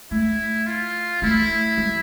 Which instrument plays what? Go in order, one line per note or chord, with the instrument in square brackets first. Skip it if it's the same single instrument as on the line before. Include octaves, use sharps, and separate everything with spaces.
[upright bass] A3 [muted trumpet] E4
[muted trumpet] F4
[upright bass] A3 [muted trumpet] E4
[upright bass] G3